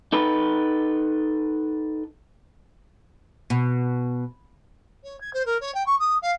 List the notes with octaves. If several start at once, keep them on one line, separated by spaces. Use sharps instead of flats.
D#4 A4 B4
B2
C#5
G#6
C5
A#4
C#5
G5
C#6
D#6
F5